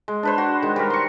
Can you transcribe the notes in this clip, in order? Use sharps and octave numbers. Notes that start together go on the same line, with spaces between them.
G#3
D4 B4 C5
F#4
D#3 G#3
G3 F#4 A#4
C6 C#6